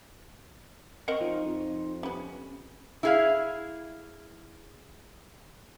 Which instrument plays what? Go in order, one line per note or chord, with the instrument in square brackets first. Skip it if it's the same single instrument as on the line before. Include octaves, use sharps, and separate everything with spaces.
[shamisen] C4 A#4 D#5 [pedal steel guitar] F#5 C#6
[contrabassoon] F3 [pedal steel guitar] D#4 F4
[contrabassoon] F2
[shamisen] G3 B3 [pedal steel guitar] C#4
[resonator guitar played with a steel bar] E4 G#4 F5